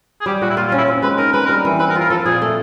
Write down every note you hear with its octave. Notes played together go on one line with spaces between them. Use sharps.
G#4
G3 G4
A#2 F#4
E4
A#3 F4
F4
C#4
E4
C4
G#3 B4
D#4 A#4
G#3 B4
G3 A#4
E3
C4 B4
A#4
F4
A#4
F3 A4
A#2 G#4
A3